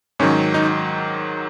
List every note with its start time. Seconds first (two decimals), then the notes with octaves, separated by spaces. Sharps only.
0.19 G#2 D#3 F#3 C#4
0.54 D#4